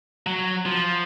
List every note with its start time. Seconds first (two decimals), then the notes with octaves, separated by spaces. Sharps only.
0.27 F#3
0.65 F3